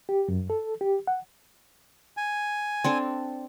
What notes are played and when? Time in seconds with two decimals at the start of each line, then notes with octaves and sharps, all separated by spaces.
0.09 G4
0.28 F#2
0.50 A4
0.81 G4
1.07 F#5
2.17 G#5
2.84 C4 D4 A4